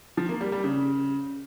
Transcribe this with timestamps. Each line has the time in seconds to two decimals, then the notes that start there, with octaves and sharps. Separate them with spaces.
0.17 F3
0.29 A#3
0.41 G3
0.52 G3
0.64 C#3